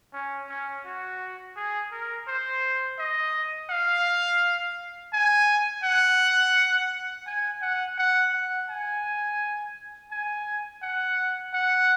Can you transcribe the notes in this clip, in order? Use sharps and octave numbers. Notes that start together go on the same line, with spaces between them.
C#4
C#4
F#4
G#4
A#4
C5
D#5
F5
G#5
F#5
G#5
F#5
F#5
F#5
G#5
G#5
F#5
F#5